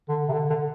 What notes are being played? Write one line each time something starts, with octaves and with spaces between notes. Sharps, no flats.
D3
C3
D3
D3